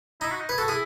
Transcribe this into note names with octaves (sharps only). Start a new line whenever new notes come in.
D#4 E4
F#4
D#4
G#4 B4
F#4 A4
E4 G#4